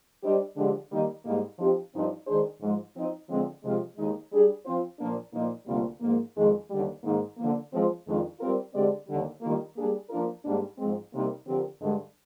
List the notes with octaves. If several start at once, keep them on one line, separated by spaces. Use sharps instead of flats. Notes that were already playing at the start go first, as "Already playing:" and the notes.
G3 D4 G4 C5 D#5
D3 F3 G#3 D4 G4
D#3 G3 A#3 D#4
G#2 G3 A#3 D#4
F3 C4 D#4 G4
G2 F3 C4 D#4
D#3 G#3 D4 G#4 C5
G#2 F3 G#3
F3 C4 D#4
D3 F3 G#3 C4
C3 F3 G#3 C4 F4
D#2 D#3 G#3 D#4
G3 D4 G#4
F3 C4 F4 C5
A#2 F3 A#3 D4
A#2 F3 A#3 D#4
D2 C3 G3 A#3 F4
G#2 F3 A#3
F2 D#3 G#3
D#2 D3 G3
G#2 D#3 A#3 D#4
D3 F3 A#3
F3 G#3 C4 F4 C5
F2 D#3 G#3 D4 F4
G3 C4 F4 A#4
D3 G#3 C4 G4 D5
D#2 D3 G3
D#3 G3 A#3 F4 A#4
G3 A#3 D4 G#4
F3 A#3 D4 F4 A#4
G#2 G3 A#3 D4
G#2 F3 G#3 C4
C3 G3 A#3 D#4 A#4
D3 F3 C4 G4 A#4
G2 D3 G#3